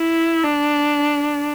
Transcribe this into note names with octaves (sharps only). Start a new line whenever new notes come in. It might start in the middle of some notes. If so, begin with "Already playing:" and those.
Already playing: E4
D4